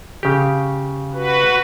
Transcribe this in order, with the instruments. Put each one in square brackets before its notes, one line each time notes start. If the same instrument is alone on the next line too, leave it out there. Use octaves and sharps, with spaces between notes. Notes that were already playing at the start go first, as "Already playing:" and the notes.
[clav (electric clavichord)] C#3 G4
[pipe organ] F#4 B4